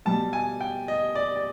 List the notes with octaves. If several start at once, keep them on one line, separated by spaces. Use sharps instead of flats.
B2 G3 A5
G#5
G5
D#5
D5
D5